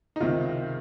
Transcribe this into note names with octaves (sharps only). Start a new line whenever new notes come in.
D#4
C#2 C3 D#3 F4